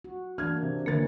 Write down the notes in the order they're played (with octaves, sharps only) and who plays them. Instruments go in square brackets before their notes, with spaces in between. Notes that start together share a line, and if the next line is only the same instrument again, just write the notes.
[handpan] F#4
[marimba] E3 [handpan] A#3 D4 [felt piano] F6 G#6
[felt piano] C3
[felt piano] G1 A#4 A6 [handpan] F3 C#4 [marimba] A#3